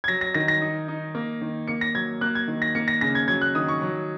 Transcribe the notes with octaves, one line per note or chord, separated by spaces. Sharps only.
G#6
F#3 A#6
A#6
D#3 A#6
A#6
D#4
D#4
A#3
D#3
A#3 C#7
A#6
F#3 G#6
A#3 F#6
G#6
D#3
A#6
A#3 C#7
A#6
C#3 A#6
G#6
F#3 G#6
F#6
D#3 D#6
C#6
F#3